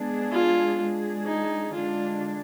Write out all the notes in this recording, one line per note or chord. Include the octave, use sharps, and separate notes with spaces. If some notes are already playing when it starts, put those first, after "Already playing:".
Already playing: G#3 B3 D4 G#4
F4
G#3 D4 G#4
D#4
D3 G#3 D4 F4